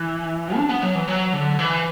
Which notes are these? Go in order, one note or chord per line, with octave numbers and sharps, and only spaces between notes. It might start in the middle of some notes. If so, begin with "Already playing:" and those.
Already playing: E3
D4
B3
F#3
E3
F#3
D3
E3